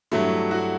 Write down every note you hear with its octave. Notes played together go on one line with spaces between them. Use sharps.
G2 F#3 A3 E4
F#4